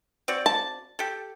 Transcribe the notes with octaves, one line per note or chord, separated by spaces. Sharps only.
C4 F#4 D5
A5
G4 A4